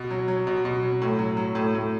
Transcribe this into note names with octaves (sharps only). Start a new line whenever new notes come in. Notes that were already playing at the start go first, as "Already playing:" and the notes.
Already playing: B2
F#3
F#3
B2
B2
F#3
A2
F#3
F#3
A2
A2